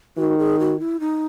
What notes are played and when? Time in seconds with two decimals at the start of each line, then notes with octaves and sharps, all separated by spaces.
0.17 D#3 F#4
0.38 G#4
0.59 F#4
0.80 E4
1.00 D#4